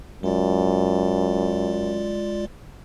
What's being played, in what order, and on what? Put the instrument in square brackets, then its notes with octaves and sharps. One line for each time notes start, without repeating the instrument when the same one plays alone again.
[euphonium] F#2 [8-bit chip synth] G#3 F4 D5